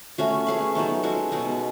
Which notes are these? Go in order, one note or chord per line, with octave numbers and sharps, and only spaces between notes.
A3 C#4 F#4
A3 C#4 G#4 B4
F#3 B3 D#4 A4
G#3 C#4 F#4 A4
B2 G#3 D#4